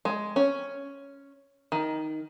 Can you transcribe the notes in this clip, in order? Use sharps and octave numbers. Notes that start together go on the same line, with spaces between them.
G#3
C#4
D#3